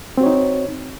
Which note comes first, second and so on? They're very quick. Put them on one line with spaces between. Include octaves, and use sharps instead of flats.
C4 F#4 C#5 D#4